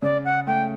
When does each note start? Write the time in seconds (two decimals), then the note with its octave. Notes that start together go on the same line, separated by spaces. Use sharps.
0.02 C#3 D5
0.25 F#5
0.47 A3 G5